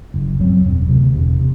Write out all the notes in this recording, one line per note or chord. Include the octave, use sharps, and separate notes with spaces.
F#1
F#2 F#3 C4
E1
D2 C3
E1
C3